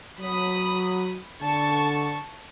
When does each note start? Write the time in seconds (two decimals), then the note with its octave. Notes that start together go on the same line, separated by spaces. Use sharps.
0.21 F#3 B5 D#6
1.42 D3 A5 C#6